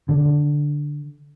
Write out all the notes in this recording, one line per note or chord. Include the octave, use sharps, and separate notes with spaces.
D3